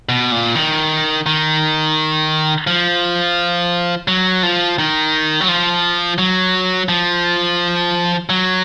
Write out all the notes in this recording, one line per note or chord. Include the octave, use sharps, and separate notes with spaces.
B2
A#2
D#3
D#3
F3
F#3
F3
D#3
F#3
F3
F#3
F3
F#3